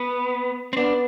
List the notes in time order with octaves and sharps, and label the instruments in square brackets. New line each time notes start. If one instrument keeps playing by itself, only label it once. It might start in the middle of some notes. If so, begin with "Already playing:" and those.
Already playing: [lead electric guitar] B3
C4
[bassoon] B3 [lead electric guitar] D4